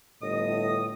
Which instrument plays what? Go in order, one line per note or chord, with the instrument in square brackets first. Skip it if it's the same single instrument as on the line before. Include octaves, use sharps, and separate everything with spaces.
[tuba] G1 [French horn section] A2 [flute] D#5 [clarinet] D#6